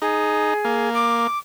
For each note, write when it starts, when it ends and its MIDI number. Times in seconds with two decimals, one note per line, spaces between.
0.02 0.54 63
0.02 0.89 68
0.65 1.27 58
0.94 1.38 86